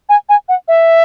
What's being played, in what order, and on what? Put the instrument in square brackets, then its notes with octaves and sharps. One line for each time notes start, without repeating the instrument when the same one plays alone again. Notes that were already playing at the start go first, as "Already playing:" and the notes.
[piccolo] G#5
G#5
F#5
E5